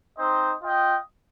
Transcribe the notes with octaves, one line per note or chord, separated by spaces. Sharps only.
C4 D#4 C5 D#5
F4 D#5 G5